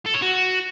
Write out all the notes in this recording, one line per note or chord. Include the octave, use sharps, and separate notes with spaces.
A4
C#5
F#4